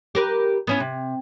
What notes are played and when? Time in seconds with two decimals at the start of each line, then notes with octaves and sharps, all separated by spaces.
0.15 G4 A#4 B4
0.67 B3 C#4 E4
0.80 C3